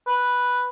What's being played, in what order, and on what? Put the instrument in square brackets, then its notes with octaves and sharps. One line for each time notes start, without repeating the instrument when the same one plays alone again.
[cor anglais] B4